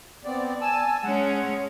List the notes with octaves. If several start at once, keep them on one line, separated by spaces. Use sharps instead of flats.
B3 C4 D5
G#5 A5 E6
G#3 C#4 F#5